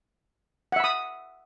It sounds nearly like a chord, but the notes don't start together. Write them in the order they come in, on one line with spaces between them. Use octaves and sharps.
F#5 E5 B5 D#6